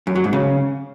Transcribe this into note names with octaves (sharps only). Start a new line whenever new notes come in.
F#2
F#3
G#2
C#3